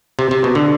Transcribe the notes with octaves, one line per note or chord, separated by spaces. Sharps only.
C3
C3
B2
D3